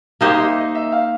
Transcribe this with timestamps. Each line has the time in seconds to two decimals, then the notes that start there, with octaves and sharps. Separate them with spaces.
0.21 A#3 D#4 G4 C5 D#5
0.34 D#5
0.39 E5
0.57 D#5
0.75 E5
0.92 F5